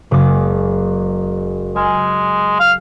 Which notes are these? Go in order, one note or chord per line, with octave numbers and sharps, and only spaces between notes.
F#1 G#3 D6
G#3 G#5 F6
F5